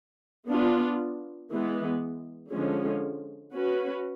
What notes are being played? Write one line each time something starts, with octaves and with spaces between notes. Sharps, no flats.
B3 D4 F4
E3 G#3 B3
D3 F3 G#3 C#4
C#4 F#4 B4